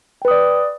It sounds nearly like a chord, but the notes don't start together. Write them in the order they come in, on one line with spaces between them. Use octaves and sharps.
G5 B4 D#6 D5